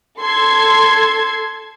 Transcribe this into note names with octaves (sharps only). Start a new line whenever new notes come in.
A4 C6 G#6